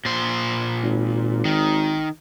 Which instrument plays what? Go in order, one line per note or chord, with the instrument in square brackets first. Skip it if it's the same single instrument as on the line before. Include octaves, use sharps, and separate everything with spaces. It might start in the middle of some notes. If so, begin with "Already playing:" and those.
[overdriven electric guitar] A#2 C5
[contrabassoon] G#1
[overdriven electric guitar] D#3